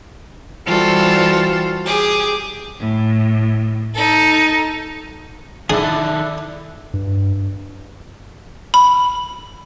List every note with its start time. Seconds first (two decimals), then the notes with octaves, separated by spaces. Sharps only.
0.67 E3 G3 F4 F#4 A4 C5
1.84 G4 G#4 D6
2.79 A2
3.96 D#4 A4
5.70 D#3 D4 E4 G#4 A4 E5
6.94 G2
8.74 B5